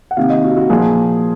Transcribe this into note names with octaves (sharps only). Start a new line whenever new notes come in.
F#5
C3 D#3 A#3 F5
D#5
F#4
F#4
A#2 F3 A#3 G#4